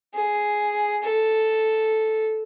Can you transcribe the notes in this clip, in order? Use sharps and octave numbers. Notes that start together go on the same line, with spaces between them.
G#4
A4